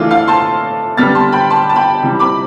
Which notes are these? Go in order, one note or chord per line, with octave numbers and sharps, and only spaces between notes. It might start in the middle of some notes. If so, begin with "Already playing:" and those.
Already playing: E3 A3 D4 F4
F5
A5 C6
D3 G3 B3 F6 A6
A5 C6
G5 B5
A5 C6
A5
G5 B5
C3 E3 G3
B5 D6